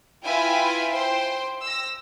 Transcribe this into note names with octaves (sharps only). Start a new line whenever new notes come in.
E4 F4 B4 E5 G5 G#5
C5 G5 C6
E6 A#6